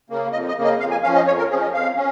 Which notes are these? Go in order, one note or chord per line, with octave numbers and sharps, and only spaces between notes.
C#3 A#3
F2 D#5
D#5
C#3 A#3
D#5
F2 F5
G#5
F3 C#4 F5
D#5
F2 C#5
A#4
F3 C#4 G#4
D#5
F2 F5
C#4